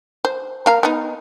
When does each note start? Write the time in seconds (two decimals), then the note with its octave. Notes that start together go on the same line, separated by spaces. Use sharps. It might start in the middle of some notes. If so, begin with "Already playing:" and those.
0.25 C5
0.66 A#3 F5 A#5
0.83 B3 D#4